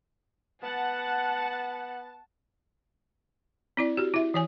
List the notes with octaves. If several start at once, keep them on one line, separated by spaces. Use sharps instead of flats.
B3 F#5 A5
C4 E4 D5
F#4 G4
E4 E5
E3 C#5 G#5